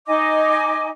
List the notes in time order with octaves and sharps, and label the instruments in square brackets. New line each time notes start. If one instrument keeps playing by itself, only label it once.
[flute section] D#4 D#5 G#5 D6